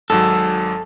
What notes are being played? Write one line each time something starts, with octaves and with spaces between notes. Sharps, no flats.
G#1 G#2 F#3 A4